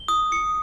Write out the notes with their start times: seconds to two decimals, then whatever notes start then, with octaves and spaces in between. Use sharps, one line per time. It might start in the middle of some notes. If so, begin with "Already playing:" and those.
Already playing: G7
0.08 D#6
0.32 C#7